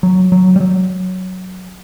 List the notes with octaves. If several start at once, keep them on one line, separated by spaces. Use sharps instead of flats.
F#3
F#3
G3
F#3